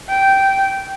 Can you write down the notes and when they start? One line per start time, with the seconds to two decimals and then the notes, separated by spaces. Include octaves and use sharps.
0.10 G5